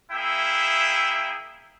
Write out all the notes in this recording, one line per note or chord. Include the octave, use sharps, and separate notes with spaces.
A#3 E4 G#4 E5 G5